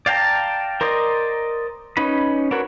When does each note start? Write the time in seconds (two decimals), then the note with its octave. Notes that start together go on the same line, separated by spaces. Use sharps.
0.06 D5 F5 G5 A5 A#5
0.81 A#4 C5 D5 D#5
1.97 C#4 D#4 B4 B5
2.51 D4 F#4 A#4 B4 C#5